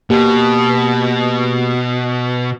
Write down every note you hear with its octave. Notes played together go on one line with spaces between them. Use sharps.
B2 A#3 G4